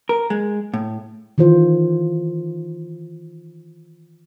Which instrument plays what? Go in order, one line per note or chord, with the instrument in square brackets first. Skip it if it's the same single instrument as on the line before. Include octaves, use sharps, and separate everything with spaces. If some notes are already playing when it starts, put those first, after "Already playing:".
[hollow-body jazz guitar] A#4
G#3
A2
[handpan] D#3 E3 F4 C5